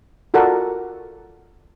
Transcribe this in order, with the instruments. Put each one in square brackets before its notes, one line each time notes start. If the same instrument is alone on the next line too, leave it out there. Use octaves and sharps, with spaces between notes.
[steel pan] F4 F#4 A4 A#4 D5 F#5